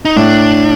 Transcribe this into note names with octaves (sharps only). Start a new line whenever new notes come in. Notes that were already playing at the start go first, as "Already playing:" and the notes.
D#4
A2 D4